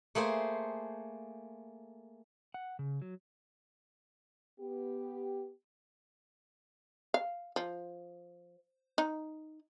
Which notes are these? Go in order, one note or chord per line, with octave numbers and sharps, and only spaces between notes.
A3 A#3 G#4 C5
F#5
C#3
F#3
B3 G4
F5
F3
D#4